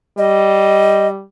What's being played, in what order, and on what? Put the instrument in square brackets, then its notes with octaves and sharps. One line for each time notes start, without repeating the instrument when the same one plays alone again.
[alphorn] G3 [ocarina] D#5